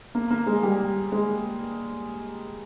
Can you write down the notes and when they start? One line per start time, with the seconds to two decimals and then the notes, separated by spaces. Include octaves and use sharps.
0.15 A#3
0.31 A#3
0.47 G#3
0.63 G3
1.12 G#3